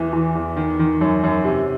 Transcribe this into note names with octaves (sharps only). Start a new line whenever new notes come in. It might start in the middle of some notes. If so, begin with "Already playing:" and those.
Already playing: E2 E3
E3
E2
D#3
D#3
F#2
F#2
C3